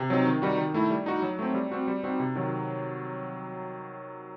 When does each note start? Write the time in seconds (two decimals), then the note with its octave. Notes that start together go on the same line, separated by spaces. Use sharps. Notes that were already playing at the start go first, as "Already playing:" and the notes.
Already playing: C3
0.10 F#3 C4 D#4
0.26 D#3
0.42 G3 D#4 F#4
0.58 D#3
0.74 A3 E4
0.90 G3
1.06 D#4 F#4
1.22 F#3
1.39 A3 C4
1.54 G3
1.72 C4 F#4
1.88 G3
2.04 C4 D#4 F#4
2.20 C3
2.35 D#3 F#3